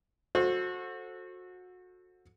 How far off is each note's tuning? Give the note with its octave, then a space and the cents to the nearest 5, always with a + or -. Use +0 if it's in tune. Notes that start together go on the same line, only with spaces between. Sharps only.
F#4 -25 A4 +0 C5 +15